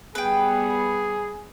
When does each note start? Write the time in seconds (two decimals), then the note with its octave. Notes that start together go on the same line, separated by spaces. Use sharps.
0.15 G3 B3 G#4 B4 G5